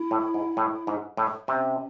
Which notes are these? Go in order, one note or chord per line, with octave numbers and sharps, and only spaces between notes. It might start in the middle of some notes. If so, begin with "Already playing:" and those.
Already playing: E4
A2
G#2
A2
G#2
A2
C3 C#4